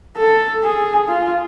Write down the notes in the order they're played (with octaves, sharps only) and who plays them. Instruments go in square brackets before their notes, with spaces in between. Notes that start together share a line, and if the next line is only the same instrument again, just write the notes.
[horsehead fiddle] A4
G#4
F4